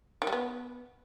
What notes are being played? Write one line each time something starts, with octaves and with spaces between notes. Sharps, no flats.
D#3
G3
B3